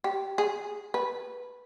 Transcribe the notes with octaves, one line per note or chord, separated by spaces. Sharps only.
G4
G#4
B4